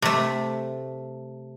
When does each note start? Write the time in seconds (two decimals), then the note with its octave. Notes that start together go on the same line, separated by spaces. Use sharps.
0.02 C3 A3